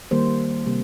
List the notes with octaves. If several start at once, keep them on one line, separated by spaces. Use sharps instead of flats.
D#3 G3 A#3 C5
C3 G3 A#3